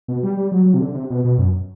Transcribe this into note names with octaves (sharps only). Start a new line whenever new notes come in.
B2
G3
G3
F#3
F#3
C3
D3
C3
B2
B2
F#2